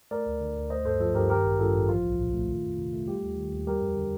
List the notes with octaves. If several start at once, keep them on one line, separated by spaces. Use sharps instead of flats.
A3 A#4 D5
D2
D3
D2
A3 C5 D#5
G2 A4 C5
F3 F4 A4
G2 G4 A#4
D#3 G4 A#4
A1
G2 F4 A4
A1
F3 F4
C2
A#2
A3
D#3
F2
C3
A3
G3 G4
D#2
D#3
D#2
G3 G4 A#4
F2
D3